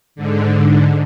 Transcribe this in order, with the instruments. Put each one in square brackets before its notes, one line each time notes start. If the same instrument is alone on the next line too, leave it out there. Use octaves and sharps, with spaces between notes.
[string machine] G#2 D3